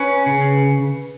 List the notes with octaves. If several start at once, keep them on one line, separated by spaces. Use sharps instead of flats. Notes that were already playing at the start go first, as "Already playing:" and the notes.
Already playing: C#4 B4
C#3